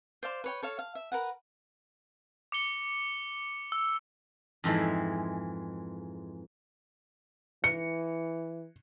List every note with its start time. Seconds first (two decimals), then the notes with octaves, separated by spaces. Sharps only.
0.23 C5 D5 F5 C6
0.44 B4 C#5 G5
0.63 A4 C#5 F5
0.79 F5
0.95 E5
1.12 A#4 B4 F#5
2.52 D6 C#7 G7
3.72 E6
4.64 F2 G#2 E3 G#3
7.64 E3 C#7